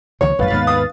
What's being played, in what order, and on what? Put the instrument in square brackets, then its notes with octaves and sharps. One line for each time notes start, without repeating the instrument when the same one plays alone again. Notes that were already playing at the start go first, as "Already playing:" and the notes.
[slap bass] C#2 D#3 F3 [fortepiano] C#5
[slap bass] A1 F#2 [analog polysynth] B4 F5 A6
[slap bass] D#2 G#2 B3
[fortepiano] D#6